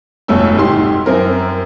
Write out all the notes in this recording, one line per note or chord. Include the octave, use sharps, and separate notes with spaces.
F1 G2 B2 A3 C#5 E6
G#1 G3 D#4 G4 C6
F#2 C4 A#4